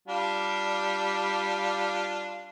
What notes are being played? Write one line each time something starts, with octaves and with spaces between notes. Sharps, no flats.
G3 D4 F4